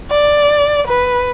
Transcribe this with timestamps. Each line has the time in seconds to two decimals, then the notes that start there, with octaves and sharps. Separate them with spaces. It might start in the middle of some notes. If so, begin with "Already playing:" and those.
0.10 D5
0.87 B4